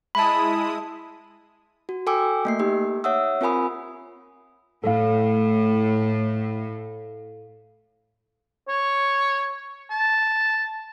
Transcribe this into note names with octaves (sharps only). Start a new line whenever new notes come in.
G#3 E4 A5 B5 D#6
F#4
A4 G5 G#5 D6 E6
A3 A#3 C7
A#3 D#4 G4
C#5 E5 F#5 D#6 E6
C4 F4 A#4 G#5 B5 D#6
A2 A4 F5
C#5
A5